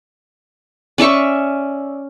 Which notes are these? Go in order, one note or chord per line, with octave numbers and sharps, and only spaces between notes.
C#4 D5 E5 C#6